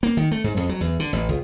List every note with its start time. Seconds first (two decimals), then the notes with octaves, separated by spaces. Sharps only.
0.03 A#3
0.17 D#3
0.31 A3
0.44 G#2
0.57 F2
0.69 F#3
0.81 E2
1.00 D3
1.13 A1
1.29 C#2